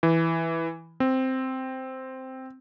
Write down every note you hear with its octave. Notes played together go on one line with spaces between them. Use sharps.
E3
C4